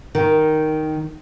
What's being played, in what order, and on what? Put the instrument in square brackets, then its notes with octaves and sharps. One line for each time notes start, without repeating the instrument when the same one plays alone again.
[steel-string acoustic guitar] D#3